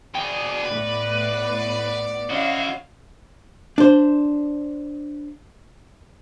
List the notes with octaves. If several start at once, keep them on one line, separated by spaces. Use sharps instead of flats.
B2 G#4 D5 G5
A2 B3 B4
C#4 E4 F#4 C#5 D#5 F5
D4 C5